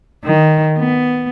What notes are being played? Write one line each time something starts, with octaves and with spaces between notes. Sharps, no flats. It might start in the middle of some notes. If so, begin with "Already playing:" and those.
D#3
B3